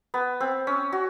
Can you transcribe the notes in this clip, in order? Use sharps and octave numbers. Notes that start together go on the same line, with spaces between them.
B3
C4
C#4
F#4